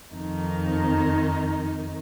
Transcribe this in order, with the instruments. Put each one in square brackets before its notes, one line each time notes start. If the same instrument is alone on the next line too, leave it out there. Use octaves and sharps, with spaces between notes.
[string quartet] F2 D#3 D#4